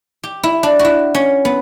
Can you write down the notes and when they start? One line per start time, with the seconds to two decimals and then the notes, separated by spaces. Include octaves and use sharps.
0.23 G4
0.43 E4
0.63 D4
0.79 F#4
0.85 E4
1.15 C#4
1.45 B3